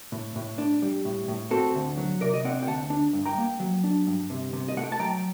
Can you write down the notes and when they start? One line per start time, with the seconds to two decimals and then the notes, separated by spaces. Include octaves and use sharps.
0.12 A2
0.36 A2
0.58 D4
0.82 G3
1.05 A2
1.28 A2
1.51 C4 F#4 A4
1.74 D2
1.98 F#3
2.21 C3 A#4 D5
2.34 D#5
2.44 C4 D5 F#5
2.63 G5
2.67 D2 F#5 A5
2.90 D4
3.13 G2
3.26 G5 A#5
3.38 A#3
3.60 F#3
3.84 D4
4.07 G2
4.30 C3
4.53 C3
4.68 D#5
4.77 A3 F#5
4.84 G5
4.92 A5
4.99 F#3 G5 A#5